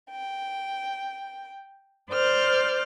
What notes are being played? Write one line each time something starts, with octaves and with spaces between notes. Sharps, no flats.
G5
C5 D5 F6 G6